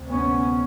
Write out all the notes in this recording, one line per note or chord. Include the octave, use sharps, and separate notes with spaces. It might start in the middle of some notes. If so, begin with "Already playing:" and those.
Already playing: D2 C3
B3 C#4